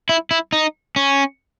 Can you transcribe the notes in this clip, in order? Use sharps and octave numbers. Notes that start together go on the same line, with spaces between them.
E4
E4
D#4
C#4